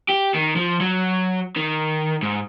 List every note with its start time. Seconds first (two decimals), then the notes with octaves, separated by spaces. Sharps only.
0.09 G4
0.34 D#3
0.56 F3
0.80 F#3
1.56 D#3
2.23 G#2